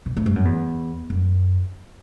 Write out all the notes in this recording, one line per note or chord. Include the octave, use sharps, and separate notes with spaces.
B2
A2
G2
F#2
E2
F#2